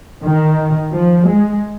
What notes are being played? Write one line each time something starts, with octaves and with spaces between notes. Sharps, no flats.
D#3
F3
G#3